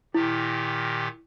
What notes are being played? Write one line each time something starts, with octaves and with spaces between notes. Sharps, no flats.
A#2 D#3 E4 G4